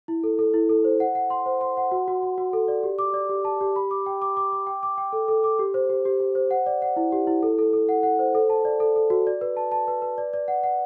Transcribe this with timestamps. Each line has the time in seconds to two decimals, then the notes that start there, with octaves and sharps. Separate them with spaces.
0.08 E4
0.23 A4
0.39 A4
0.54 E4
0.69 A4
0.84 C5
1.00 F#5
1.15 F#5
1.30 C6
1.46 C5
1.61 C6
1.77 F#5
1.91 F#4
2.08 F#4
2.23 F#4
2.38 F#4
2.53 A4
2.68 D5
2.83 G4
2.99 D6
3.14 D5
3.29 G4
3.45 A5
3.61 G4
3.76 B5
3.91 D6
4.06 G5
4.22 D6
4.37 D6
4.53 D6
4.67 G5
4.83 D6
4.98 G5
5.13 A4
5.28 A4
5.44 D6
5.59 G4
5.74 C5
5.90 G4
6.05 G4
6.20 G4
6.35 C5
6.51 F#5
6.66 D5
6.82 F#5
6.96 E4
7.12 G4
7.27 E4
7.43 A4
7.58 A4
7.73 A4
7.89 F#5
8.03 F#5
8.19 C5
8.35 A4
8.50 A5
8.65 D5
8.80 A4
8.96 A4
9.10 F#4
9.27 D5
9.41 B4
9.57 A5
9.72 A5
9.88 B4
10.02 B4
10.18 D5
10.33 D5
10.48 F#5
10.63 F#5